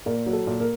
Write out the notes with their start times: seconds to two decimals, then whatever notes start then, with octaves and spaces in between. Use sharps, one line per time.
0.06 A#2 A#3 A#4
0.26 F#3
0.33 A4
0.47 A#2
0.60 A#3 A#4